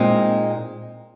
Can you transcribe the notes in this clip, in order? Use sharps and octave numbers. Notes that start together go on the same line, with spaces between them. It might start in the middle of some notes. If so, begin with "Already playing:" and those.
Already playing: A#2 G#3 C4 D#4